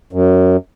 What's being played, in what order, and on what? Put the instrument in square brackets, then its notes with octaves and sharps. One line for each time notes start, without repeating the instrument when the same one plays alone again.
[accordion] F#2